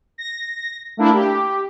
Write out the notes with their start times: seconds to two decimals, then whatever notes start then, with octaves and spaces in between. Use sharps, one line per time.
0.18 A#6
0.97 A3 A#3 D4 E4
1.13 G4